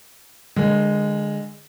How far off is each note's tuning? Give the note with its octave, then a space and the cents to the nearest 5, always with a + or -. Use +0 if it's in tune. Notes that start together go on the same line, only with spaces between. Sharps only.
D3 +20 G#3 -10 A#4 +0